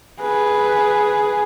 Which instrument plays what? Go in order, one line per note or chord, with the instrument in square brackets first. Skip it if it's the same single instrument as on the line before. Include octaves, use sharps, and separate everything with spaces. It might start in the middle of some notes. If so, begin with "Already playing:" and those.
[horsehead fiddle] G#4 B4